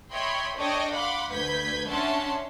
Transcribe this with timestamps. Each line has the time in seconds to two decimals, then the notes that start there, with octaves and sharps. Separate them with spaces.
0.12 C#5 D#5 E5 G5 B5 C6
0.57 D4 A4 C#5 D#5 G5
0.92 F5 F#5 B5 C6 D6
1.30 D2 B4 G6 G#6 B6
1.88 C#4 D4 E5 F#5 A5 C6